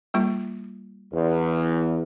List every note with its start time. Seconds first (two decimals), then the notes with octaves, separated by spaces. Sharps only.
0.14 G3 A#3 F4
1.12 E2